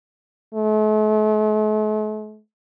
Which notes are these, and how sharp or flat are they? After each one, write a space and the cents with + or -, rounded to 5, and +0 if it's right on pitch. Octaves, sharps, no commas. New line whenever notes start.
A3 -45